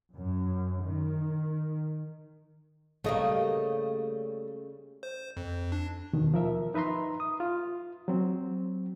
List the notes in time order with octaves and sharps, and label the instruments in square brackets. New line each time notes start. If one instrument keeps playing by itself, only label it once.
[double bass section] F#2
D#3
[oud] C#3 G3 A#3 [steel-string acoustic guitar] A3 D#5
[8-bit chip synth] C5
F2
D4
[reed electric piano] D#2 B2 D#3
F3 A#4 E5
D#4 B4 E5 A#5 C6
D#6
F4
F#3 C4